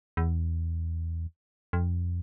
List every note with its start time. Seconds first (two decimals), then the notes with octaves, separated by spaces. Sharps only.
0.17 E2
1.73 F2